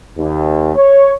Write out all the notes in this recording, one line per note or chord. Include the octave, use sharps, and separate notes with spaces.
D#2
C#5